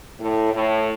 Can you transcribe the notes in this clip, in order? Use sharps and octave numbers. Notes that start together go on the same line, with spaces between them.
A2
A2